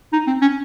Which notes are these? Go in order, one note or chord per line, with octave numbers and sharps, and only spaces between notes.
D#4
C4
C#4